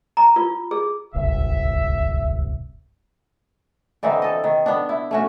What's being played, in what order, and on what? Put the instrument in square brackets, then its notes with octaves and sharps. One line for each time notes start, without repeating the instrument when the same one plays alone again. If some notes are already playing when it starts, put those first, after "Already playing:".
[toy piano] A#5
F4
G#4
[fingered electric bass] D1 G1 C2 [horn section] E5
[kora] D3 E3 C4 D#4
A4 D#5
D#3
B3 D4
E4
A3 C#4 F#4